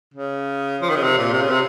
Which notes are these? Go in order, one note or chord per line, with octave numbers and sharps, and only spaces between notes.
C#3
F3
D#3
C#3
C3
A#2
C3
C#3
C3